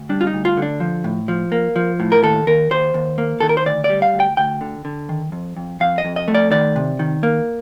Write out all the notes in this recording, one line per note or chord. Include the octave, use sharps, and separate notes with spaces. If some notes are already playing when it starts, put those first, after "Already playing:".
Already playing: D2
G3 D4
F4
D#4
D2
F4
D3
D4
F3
A2
F3
A#3
F3
A2
A#4
D#2 A4
D#2 A#4
D#2 C5
D#2
A#3
D#3 A4
A#4
C5
D2 D5
D5
G3
F5
D2
G5
D2 G5
D3
D3
D#3
F2
F2
F2 F5
D#5
F2
D#5
A3
D5
D#3 D5
C3
D#3
A#3